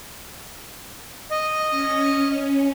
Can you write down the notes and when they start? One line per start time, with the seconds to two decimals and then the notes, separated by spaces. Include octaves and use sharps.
1.31 D#5
1.70 C#4